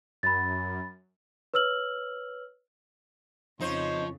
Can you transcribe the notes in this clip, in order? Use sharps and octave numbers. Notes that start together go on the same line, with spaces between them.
F#2 B5 A6
B4 C#5 E6 F6 F#7
F2 C#3 F3 D#4 C5 C#5